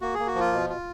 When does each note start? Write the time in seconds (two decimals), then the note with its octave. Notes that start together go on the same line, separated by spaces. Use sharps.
0.01 A#3 F#4
0.14 A#3 G#4
0.27 F#4
0.35 F3 F4
0.52 B2
0.70 F4